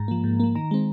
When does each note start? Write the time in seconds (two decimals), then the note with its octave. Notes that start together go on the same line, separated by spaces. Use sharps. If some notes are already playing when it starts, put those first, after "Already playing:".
Already playing: G#2 A#5
0.08 F3 A#3
0.24 G#2
0.40 F3 A#3
0.55 D#3 A#5
0.71 G#3 C4